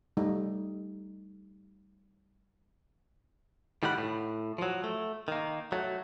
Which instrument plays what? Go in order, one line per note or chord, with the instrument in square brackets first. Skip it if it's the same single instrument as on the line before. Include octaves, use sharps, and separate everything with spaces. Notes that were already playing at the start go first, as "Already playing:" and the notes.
[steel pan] G3 A3 D#4
[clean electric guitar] A2 D#3 G3 D5 F#5 B5
A2
F3 F#3
A3
D#3 A#3
F#3 A3